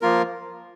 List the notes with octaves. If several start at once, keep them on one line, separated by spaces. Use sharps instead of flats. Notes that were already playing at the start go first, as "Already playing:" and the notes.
F3 A#3 F4 A#4